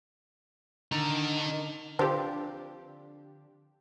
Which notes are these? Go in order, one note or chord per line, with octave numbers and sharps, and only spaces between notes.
D3 D#4 A#4
D3 F3 C4 D4 G4